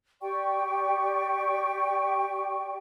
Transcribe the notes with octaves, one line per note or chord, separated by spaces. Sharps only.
G4 D5 G5 C#6